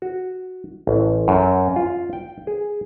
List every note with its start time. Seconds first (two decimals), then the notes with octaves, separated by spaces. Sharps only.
0.02 F#4
0.87 A1
1.28 F#2
1.76 F4
2.13 G5
2.47 G#4